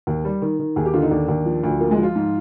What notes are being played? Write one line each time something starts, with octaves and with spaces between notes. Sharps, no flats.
D#2
G3
D#3
D#3
D#2 G#4
G4
D3 F4
D#4
D#2 D4
D#2
F3
D2
F3 A#3
G#3
F3
F4
G#2